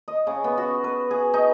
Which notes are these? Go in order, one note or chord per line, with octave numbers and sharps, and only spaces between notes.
D#5
C#3
B3
F#4
B4
G#4
D#4